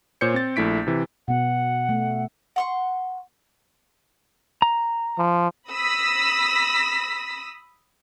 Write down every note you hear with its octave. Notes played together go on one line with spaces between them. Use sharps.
A#2 C5 C#5 G6 C#7
C4 A6
A#1 A3 E4 B6 D7
C3 E3
B2 B3 F#5
A3
F#5 C6 C#6
A#5
F3
B5 D#6 E6 A#6 B6